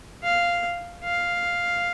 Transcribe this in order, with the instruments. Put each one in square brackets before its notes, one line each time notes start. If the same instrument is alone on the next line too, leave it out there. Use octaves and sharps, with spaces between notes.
[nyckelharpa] F5
F5